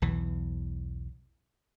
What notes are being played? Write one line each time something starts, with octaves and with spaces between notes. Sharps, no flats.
B1 E2 E3